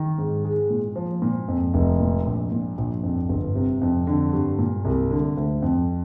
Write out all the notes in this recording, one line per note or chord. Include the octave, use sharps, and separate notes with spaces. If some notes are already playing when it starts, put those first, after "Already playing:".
Already playing: D#3
G#2
G#3
A#2
F3
A#2
F2
F1
A#2
A#1
A#2
A#1
F2
G1
C3
F2
D3
G2
A#2
C2
D3
D2
F2